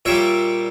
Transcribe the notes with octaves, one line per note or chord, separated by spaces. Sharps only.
A#2 G3 C#5 E5